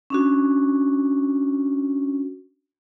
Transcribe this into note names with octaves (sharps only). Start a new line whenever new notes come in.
C#4 D4 F#4